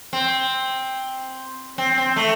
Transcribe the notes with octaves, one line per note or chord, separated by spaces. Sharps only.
C4
C4
C4
A3